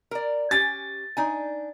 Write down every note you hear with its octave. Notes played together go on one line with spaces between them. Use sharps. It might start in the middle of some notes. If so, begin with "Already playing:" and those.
A#4 D5
C#4 G4 G#5 A6
D4 D#4 G#5